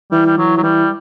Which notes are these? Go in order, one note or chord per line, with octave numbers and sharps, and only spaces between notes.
E3 G3
G3
E3 F#3
F#3
E3 G3